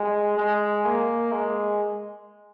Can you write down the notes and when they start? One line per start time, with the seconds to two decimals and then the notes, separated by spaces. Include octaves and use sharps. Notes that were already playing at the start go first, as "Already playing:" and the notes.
Already playing: G#3
0.37 G#3
0.85 A#3
1.32 G#3